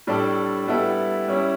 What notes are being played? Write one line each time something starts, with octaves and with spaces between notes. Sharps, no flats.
A2 G3 D4 A4 D5
G3 B3 E4 A4 E5
G3 C#4 E4